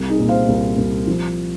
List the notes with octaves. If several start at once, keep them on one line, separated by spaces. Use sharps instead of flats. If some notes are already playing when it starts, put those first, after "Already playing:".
Already playing: C2
D#4 G#4
A#2
C5 F5
C2
C2
F3